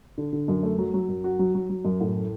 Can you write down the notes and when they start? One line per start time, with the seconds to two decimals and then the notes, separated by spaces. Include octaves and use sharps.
0.18 D3
0.33 D3
0.48 F#2
0.63 A3
0.79 F#3
0.94 F#3
1.09 F#2
1.24 F#4
1.39 F#3
1.55 F#3
1.70 F#3
1.85 F#2
2.00 A2